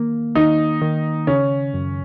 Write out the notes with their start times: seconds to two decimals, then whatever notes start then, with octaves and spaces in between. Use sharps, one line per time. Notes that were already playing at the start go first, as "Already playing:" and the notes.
Already playing: D#3 A#3
0.35 D#3 D#4
0.82 D#3
1.27 C#3 C#4
1.74 F#2